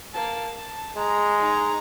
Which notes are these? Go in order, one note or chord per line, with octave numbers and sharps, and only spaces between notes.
A#3 A5
A5
G#3 A#5
D#4 A#5